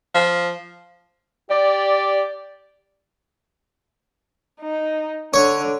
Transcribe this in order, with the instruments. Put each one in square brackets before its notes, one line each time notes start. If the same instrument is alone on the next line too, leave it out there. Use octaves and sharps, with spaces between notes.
[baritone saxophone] F3
[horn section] G4 D5
[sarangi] D#4
[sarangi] D3 [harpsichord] C#5